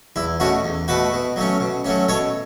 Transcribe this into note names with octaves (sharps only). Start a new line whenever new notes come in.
E2 E4
B2 A3 C#4 F#4
E2
B2 A3 F#4 B4
B2
F#3 A3 C#4
B2
F#3 A3 C#4
B2 A4 C#5